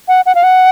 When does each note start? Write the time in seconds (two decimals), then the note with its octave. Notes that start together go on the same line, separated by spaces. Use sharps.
0.08 F#5
0.26 F#5
0.35 F5
0.43 F#5